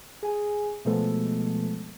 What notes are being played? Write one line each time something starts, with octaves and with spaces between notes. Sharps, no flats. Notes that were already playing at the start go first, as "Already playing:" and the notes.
G#4 G#5
B2 F3 G#3 A3 B3 A4